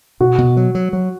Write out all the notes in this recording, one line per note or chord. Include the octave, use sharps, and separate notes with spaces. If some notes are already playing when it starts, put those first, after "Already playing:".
B2 F#4
B2
F#3
F#3
F#3